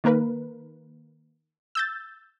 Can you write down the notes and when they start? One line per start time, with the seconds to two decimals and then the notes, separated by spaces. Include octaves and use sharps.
0.04 D#3 A#3 A#4 B4
1.75 E6 G6 A6